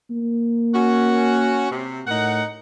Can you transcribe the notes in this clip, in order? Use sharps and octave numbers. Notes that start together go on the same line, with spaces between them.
A#3
C#4 F#4
C3
A2 D#4 A#4 F#5